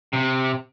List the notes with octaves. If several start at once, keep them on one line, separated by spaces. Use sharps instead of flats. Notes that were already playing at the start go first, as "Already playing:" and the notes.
C3